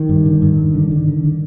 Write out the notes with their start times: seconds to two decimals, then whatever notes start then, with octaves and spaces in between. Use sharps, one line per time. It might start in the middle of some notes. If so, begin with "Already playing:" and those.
Already playing: D#3
0.09 G2
0.26 D3
0.42 G2
0.58 G2
0.74 D3
0.91 D3
1.07 D3
1.24 D3